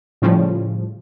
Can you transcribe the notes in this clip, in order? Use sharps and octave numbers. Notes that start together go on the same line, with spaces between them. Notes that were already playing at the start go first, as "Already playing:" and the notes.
A2 C#3 F3 G3